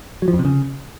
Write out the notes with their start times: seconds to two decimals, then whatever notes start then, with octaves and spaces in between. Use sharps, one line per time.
0.22 F#3
0.28 F3
0.33 F2
0.39 C3
0.45 C#3